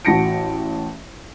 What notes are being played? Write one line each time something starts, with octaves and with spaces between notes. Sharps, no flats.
A1 F#4 A5 A#6 C#7 D7